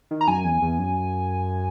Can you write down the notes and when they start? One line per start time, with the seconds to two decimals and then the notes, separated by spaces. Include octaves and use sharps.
0.11 D#3
0.21 A#5
0.28 F#2 G#5
0.45 E2
0.62 E2
0.79 F#2